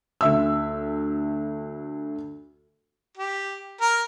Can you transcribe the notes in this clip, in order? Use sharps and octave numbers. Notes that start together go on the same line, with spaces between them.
D2 E5 E6
G4
A#4